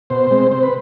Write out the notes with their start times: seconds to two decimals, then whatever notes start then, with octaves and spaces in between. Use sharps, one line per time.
0.10 B2 C5
0.31 G#3 C4
0.51 C3 C5
0.63 B4